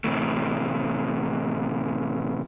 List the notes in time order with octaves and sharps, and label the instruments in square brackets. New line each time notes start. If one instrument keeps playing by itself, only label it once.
[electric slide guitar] A2 C3 E3 A3